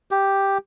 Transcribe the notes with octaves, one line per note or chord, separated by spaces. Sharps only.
G4